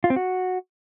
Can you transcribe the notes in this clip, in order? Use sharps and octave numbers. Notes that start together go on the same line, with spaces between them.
F4
C4
F#4